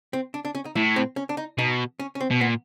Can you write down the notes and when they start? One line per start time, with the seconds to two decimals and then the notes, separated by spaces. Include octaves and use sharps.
0.13 C4
0.34 D4
0.45 D4
0.55 C#4
0.65 D#4
0.75 A2 E4
0.96 C4
1.16 C#4
1.29 D4
1.37 D#4
1.58 B2 D#4
2.00 C#4
2.15 C#4
2.21 C4
2.31 B2
2.41 A#2 B3